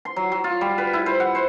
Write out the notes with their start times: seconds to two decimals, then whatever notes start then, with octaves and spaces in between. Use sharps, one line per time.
0.05 C6
0.16 F#3
0.32 F#3
0.44 F4
0.61 G3
0.78 B4
0.93 E4
1.06 C5
1.20 F#5
1.35 C5